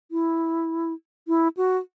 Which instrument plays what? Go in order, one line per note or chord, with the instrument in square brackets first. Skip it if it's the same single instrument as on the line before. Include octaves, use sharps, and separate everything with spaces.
[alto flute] E4
E4
F#4